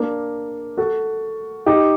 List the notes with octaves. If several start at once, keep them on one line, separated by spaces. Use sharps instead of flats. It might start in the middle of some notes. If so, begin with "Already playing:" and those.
Already playing: A#3 D4
F#4 A4
D#4 G4